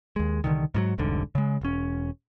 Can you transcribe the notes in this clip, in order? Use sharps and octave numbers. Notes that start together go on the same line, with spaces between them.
D#2 G#3
C2 B2 D3 D#3
G#2 E3 F#3
F1 C2 G#2 D3
C#3 G#3
E1 C#4